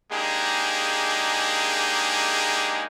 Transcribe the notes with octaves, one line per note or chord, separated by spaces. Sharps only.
G#3 A#3 D4 D#4 G4 G#4